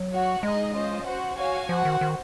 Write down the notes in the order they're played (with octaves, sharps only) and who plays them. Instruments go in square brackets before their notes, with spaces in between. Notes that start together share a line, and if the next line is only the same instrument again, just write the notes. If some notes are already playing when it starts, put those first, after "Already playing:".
Already playing: [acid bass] F#3
[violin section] F#4 C#5 F#5
[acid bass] G#3 [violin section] D#4 G#4 D#5
[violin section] C#4 F4 C5 D#5
F#4 C5 F#5
F#4 C#5 F5 G#5
[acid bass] F3 [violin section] F#4 C5 F#5
[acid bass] D#3
D#3